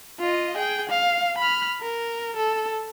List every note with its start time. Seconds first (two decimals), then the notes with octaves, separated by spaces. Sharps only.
0.20 F4 D#5
0.57 G#4 G5
0.90 F5
1.38 B5 F6
1.81 A#4
2.37 A4